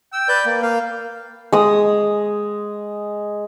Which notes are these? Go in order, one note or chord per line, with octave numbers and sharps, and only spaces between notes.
G5 E6
B4 D5 G6
A#3
A#3 F5
G#3 D#6